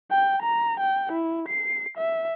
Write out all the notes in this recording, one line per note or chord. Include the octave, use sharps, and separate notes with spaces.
G5
A#5
G5
E4
C7
E5